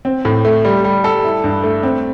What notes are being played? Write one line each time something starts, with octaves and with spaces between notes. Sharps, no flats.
C4
A2
A3
G3
G3
A4
E4
G2
A3
C4